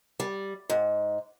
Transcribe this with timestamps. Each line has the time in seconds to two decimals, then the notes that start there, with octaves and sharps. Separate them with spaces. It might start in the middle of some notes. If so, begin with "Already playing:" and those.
0.20 G3
0.70 G#2